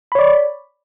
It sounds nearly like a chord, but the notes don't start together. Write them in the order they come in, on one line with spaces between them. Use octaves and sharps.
B5 C#5 D5